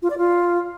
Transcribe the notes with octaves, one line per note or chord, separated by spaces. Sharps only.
F4
D5
F4